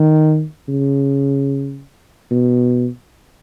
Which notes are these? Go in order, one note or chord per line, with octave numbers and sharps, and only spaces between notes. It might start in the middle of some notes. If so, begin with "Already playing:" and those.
Already playing: D#3
C#3
B2